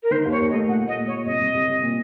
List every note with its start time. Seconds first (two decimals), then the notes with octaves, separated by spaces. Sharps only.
0.03 A#4
0.11 D#3 C5
0.25 D#2 C#5
0.40 D#2
0.50 D#5
0.54 A3
0.68 A#2 F#5
0.83 A3 D#5
0.96 A#2
1.07 C#5
1.12 A#2
1.25 C2 D#5
1.40 C2
1.54 C2
1.69 C3
1.83 A#2